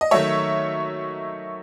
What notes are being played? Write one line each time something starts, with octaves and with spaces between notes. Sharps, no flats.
D#5
D#3 F#3 A3 C#5 E5